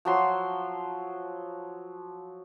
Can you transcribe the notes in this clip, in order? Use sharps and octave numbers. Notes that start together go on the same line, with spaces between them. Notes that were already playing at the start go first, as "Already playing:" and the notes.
F3 F#3 C6